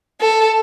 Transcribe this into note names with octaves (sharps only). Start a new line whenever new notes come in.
A4